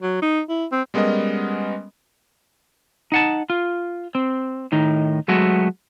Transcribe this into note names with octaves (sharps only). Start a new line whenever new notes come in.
F#3
D#4
E4
C4
G3 G#3 B3 C#4 A#4 D#5
D#4 F#5 A5
F4
C4
A2 D#3 D#4
F#3 G#3 A3 B3 F#4